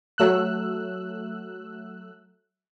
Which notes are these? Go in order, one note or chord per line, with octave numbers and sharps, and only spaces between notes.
F#3 A3 E6 F#6